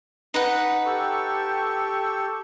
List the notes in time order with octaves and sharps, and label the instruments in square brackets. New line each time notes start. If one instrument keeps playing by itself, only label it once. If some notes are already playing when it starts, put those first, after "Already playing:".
[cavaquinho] D#4 B4 F#5
[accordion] G4 A4 C#6